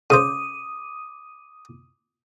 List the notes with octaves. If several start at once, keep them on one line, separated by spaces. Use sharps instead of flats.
C#3 C5 D6 D#6 D#7